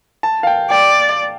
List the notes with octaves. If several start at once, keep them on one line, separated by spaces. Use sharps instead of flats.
A5
F5
G5
D5 G5